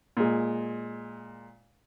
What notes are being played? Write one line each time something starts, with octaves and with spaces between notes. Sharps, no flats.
A#2 G#3